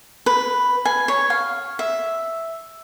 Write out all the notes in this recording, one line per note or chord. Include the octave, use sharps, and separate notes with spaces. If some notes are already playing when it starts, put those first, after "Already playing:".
B4
G#5
C#5
F5
E5